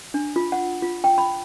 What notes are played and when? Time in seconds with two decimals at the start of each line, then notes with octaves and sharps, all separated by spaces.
0.14 D4
0.36 F4
0.52 F#5
0.82 F4
1.04 G5
1.18 B5